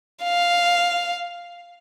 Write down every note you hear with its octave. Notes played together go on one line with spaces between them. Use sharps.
F5